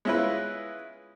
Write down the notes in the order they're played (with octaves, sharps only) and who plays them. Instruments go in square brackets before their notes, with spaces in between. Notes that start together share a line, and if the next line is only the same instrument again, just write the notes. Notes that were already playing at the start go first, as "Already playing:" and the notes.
[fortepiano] G#3 C#4 E4 F4 B4